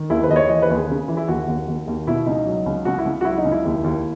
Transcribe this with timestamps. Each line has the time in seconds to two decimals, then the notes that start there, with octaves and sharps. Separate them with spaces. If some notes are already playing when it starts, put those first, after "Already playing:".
Already playing: D#3
0.10 D#2 E4
0.23 B4
0.30 D#2 D#5
0.36 C#5
0.49 E3 D#5
0.62 B4
0.70 D#2
0.76 G#4
0.90 C#3
1.08 E3
1.17 E4
1.28 D#2 F#4
1.48 D#2
1.68 D#2
1.88 D#2
2.07 B2 E4
2.26 C#2 D#4
2.46 F#3
2.66 C#2
2.85 C#2 F#4
2.98 E4
3.06 C#2
3.21 F#4
3.25 F#3 E4
3.38 D#4
3.45 C#2
3.52 E4
3.65 D#2
3.84 D#2